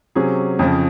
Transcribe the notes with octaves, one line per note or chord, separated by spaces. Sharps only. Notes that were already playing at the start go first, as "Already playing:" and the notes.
C3 F#3 C#4 G#4
F2 C#3 F3